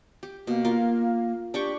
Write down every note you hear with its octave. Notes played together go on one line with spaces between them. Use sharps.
G4
B2 A#3
F4 A#4
D4 G4 G5 C#6